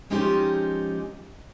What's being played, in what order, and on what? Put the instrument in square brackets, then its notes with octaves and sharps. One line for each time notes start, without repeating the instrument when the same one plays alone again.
[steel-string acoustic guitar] F3 G#3 C#4 D#4 F4 G4